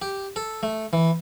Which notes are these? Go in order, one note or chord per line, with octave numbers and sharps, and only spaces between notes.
G4
A4
A3
E3